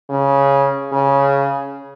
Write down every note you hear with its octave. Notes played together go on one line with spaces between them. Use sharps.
C#3
C#3